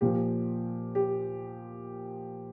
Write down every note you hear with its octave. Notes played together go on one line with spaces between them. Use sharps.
A#2 F3 G4
G4